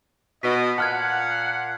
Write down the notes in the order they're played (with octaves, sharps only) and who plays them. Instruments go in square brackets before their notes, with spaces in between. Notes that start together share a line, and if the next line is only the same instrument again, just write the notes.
[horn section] B2 D#5 [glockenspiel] B6
[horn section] A#2 F5 F#5 [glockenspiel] A5 F6 G#6